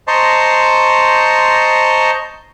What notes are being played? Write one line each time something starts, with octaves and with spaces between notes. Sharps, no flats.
C5 D#5 A5 A#5 C6 C#6